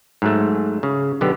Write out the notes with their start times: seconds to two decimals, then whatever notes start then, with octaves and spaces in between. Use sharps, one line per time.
0.22 G#2 F#3 A3
0.83 C#3
1.21 B1 D3 B3 G4